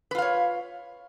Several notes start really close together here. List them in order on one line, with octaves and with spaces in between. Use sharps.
B4 F4 F5 C#5